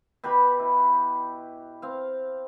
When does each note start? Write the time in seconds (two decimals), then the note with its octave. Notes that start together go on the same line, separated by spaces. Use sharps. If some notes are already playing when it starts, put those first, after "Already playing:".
0.24 B2 G4 B4 B5
0.59 E4
1.82 C4 F5